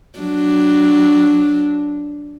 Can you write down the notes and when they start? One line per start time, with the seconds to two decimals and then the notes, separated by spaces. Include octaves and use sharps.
0.19 F#3 D4